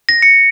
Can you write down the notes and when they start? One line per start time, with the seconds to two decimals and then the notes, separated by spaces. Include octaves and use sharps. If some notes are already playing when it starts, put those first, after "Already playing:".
0.09 A#6
0.22 C#7